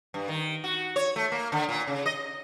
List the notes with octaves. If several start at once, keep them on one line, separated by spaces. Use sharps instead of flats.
G2
D#3
F#4
C#5
A3
A#3
D3
A#2
C#3
D#5